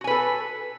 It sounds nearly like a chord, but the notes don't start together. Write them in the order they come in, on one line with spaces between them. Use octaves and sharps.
F#4 G#5 B4 A4